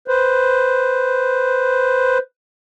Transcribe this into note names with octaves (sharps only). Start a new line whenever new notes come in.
B4 C5